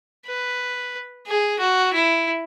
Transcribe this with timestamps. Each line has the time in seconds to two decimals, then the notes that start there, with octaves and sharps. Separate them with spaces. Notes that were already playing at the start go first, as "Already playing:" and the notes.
0.26 B4
1.27 G#4
1.60 F#4
1.93 E4